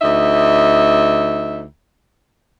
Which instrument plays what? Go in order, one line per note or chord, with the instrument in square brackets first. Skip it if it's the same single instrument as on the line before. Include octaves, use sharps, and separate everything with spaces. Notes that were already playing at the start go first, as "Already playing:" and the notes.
[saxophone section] D2 D#4 E5